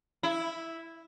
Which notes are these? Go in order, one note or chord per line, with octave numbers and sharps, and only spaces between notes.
E4